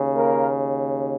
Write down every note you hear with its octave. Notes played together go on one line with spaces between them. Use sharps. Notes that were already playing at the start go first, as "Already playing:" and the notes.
Already playing: D#2 C#3
A#3 A#4